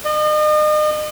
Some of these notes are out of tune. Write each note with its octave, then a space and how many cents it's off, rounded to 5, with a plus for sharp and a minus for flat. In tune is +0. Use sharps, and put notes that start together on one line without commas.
D#5 -40